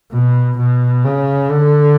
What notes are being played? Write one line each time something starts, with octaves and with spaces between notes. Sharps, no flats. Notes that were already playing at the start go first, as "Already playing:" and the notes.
B2
B2
C#3
D3